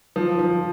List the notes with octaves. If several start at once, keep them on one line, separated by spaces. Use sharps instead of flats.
F3
F3